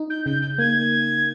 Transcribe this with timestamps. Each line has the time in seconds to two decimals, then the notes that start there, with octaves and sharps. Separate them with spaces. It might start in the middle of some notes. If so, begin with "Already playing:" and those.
Already playing: D#4
0.09 G6
0.26 C#3 G6
0.42 G6
0.58 A#3 G#6